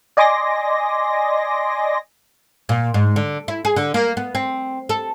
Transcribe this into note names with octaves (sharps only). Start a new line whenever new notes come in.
D5 D#5 G#5 C6 D6 A#6
A#2
G#2
D3
E4
G#4
D3
A#3
B3
C4
A4